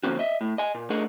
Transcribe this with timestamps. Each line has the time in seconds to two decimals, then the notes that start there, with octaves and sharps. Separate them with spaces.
0.03 D3 F3 A#3 C4 C#4 F#4
0.19 D#5 E5
0.41 A2
0.58 D#5 G#5
0.75 A#2
0.90 A3 D4 G#4 A#4 D#5 F#5